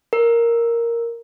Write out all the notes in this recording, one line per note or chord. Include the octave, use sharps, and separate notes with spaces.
A#4